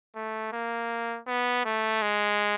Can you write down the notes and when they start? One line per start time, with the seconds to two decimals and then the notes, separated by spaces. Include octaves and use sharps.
0.15 A3
0.52 A#3
1.27 B3
1.65 A3
2.02 G#3